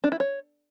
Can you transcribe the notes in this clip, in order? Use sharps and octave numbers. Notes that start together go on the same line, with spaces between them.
D4
E4
C#5